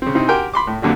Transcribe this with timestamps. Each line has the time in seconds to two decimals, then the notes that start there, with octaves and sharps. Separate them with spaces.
0.02 C#3 C4
0.15 C3 C4 D#4 E4
0.28 F#4 G4 A#4 G5 G#5 C6
0.53 B5 C6 D6
0.67 A2
0.82 F2 A#2 D3 F#3 G3